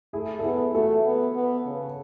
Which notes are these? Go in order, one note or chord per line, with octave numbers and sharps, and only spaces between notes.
A3 E4 G#4
A4
B3 E4 G#4
A3 F#4 A4
B3
B3
C#3